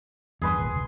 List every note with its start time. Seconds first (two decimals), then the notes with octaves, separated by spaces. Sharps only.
0.42 E2 G2 G#4 B4 C6
0.57 G#1 D#2 A#2
0.71 E1 C#2